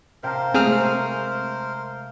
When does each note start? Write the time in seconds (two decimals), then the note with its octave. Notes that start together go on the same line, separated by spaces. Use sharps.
0.23 C3 A#4 C5 F5 G5 A5 A#5
0.54 C3 G#3 A3 C4 G#4 F6